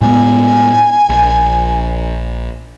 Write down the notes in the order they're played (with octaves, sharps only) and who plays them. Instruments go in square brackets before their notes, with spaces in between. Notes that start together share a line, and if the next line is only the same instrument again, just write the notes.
[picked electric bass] A2 G#3 B3 [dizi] G#5
[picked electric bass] A#1